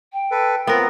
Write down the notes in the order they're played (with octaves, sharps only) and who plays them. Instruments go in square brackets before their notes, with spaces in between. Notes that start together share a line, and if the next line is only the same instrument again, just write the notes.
[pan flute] G5
[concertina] A4 B4
[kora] B3 A#4 [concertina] C4 F4 F#5